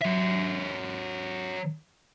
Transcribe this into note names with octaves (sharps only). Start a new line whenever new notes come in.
F#3 E5